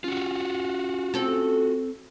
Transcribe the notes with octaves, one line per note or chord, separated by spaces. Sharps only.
C#4 F4 F#4
C4 A4